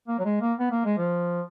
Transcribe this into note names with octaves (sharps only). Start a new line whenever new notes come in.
A#3
F#3
G#3
A#3
B3
A#3
G#3
F3